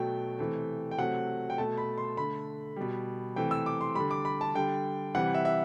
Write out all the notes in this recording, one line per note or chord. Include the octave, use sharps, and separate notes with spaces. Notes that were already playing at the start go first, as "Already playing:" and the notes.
Already playing: B2 F#3 A3 G5
C3 E3 A3
G5
C3 F#3 A3 F#5
G5
B2 A3 A5
B5
C6
D3 A3 B5
B2 G3
C3 E3 A3 G5
E6
D6
C6
D3 G3 B5
D6
B5
A5
D3 G3 G5
C3 E3 G3 F#5
E5
E5